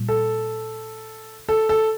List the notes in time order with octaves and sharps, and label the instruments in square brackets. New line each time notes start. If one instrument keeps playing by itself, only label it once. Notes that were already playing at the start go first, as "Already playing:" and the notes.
Already playing: [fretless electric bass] A#2 G3
[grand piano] A4
A4
A4